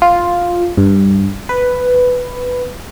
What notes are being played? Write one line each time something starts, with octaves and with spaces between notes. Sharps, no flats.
F4
G2
B4